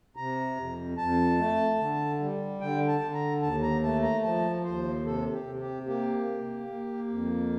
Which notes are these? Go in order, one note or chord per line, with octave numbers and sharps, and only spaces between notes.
C3 A#5
F2
F2 A5
A3
D3
G3
D3 G5
A5
D3
A#5
D#2 A5
A#5
A3 A5
A#5
F3 A5
D#2 C5
C3 A4
G4
C3
G4
A#3 G4
A#3
A#3
F2